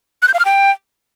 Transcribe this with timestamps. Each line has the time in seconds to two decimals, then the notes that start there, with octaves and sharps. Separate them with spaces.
0.22 F#6
0.28 G6
0.34 F5
0.39 F6
0.45 G5